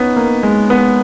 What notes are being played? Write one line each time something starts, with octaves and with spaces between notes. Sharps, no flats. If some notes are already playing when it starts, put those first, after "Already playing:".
Already playing: B3 C#4 D#4
A#3
G#3
B3